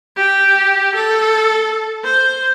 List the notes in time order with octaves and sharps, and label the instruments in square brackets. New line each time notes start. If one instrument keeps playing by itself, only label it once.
[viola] G4
A4
C5